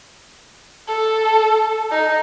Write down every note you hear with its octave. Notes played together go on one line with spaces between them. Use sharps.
A4
D#4